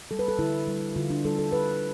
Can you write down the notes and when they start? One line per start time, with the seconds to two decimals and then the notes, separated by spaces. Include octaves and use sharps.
0.11 G3 A4
0.19 B4
0.28 A4
0.39 D3 E4
0.67 G3
0.96 D3 F4
1.10 D4
1.25 G3 A4
1.39 A4
1.52 D3 B4